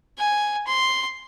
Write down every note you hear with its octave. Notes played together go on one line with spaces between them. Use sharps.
G#5
C6